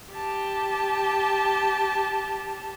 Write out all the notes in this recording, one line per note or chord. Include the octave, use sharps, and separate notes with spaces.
G4 A5